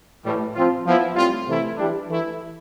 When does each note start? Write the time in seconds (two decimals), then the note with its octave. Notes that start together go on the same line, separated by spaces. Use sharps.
0.24 A2 E3 G3
0.55 F3 C4 F4
0.85 F3 B3 E4
1.15 A2 G3 C4 F4
1.47 C3 E3 A3 E4
1.77 E3 G3 D4
2.08 E3 A3 E4